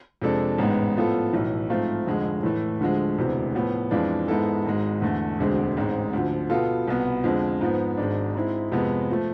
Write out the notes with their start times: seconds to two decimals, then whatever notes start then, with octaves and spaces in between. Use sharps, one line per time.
0.22 F2 C3 G#3 D4 A4
0.58 A1 G#2 G#3 B3
0.96 A2 F3 B3 F4 A4
1.33 B1 A2 E3
1.69 G#2 F3 A3 C4 F4
2.07 F1 F2 D3 G#3
2.43 A2 E3 A3
2.80 D2 D3 F3 G#3
3.18 E1 D2 C3 E3
3.55 A2 F3 B3
3.91 F2 E3 G#3 D4 F4
4.28 G#2 G#3 B3 E4 A4
4.66 G#1 G#2 G#3
5.02 E2 D3 A3
5.39 E1 D2 D3 G#3 C4
5.77 A1 G#2 G#3 C4
6.13 D2 D3 F3
6.50 B2 B3 F4 A4
6.87 C2 B2 B3
7.24 F2 D3 F3 G#3
7.61 G#2 F3 B3
7.97 G#1 G#2 G#3 D4
8.35 G#2 G#3 C4 E4
8.72 F2 C3 G#3 B3
9.11 F3 A3